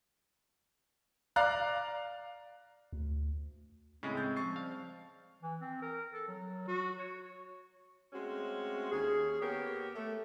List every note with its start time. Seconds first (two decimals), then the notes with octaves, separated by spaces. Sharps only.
1.36 D5 F5 A#5 F#6
2.93 D2
4.03 A2 C#3 G#3 C4
4.17 G6 A6
4.36 F3 G3 C4 C#6 A6 C7
4.56 F5
5.43 E3
5.61 C4
5.82 A#4
6.13 A4
6.28 F#3
6.68 F#4
6.99 C#5
8.13 G#3 A3 C4 C#4 F#4
8.92 D#2 C#4 G#4
9.41 A#3 B3 G4 A#4 C#5
9.95 A3